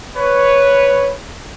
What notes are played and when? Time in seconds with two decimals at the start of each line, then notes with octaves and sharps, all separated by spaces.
0.17 B4 C#5